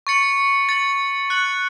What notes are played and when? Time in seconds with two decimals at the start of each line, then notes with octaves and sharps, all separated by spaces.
0.07 C#6 A6 C#7 F#7
0.69 A6 C#7 F#7
1.30 F#6 C#7 F#7